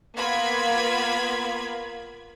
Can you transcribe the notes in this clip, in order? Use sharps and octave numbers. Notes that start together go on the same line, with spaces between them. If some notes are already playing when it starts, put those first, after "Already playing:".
A#3 B3 F4 B5 G#6